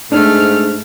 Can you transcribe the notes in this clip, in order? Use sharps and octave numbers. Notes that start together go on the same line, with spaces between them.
G#2 A3 D4 F6